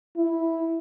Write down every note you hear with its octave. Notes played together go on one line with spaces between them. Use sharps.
E4